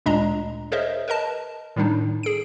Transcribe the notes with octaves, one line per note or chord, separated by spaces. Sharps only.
D2 A#2 G#3 D4 D#5 A#5
G#4 A#4 C5 C#5 D#5 E5
A#4 B4 D#5 A5
A2 D#3 G3 D4 D#4
G#4 D7